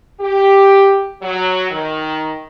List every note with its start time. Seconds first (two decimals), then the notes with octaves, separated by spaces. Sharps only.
0.20 G4
1.22 F#3
1.70 D#3